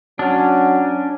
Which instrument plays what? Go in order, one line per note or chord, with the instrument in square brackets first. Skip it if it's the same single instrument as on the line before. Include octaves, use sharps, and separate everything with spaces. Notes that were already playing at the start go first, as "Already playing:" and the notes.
[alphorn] F#3 [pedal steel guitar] C#4 D4